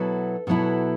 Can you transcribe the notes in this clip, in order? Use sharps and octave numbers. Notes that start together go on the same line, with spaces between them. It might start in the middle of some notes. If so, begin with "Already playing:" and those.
Already playing: B2 F#3 B3 E4 A4
B2 F#3 B3 E4 A4